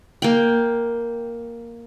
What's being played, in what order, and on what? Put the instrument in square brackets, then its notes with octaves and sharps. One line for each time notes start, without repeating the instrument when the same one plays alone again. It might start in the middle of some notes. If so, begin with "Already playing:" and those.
[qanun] A#3 G5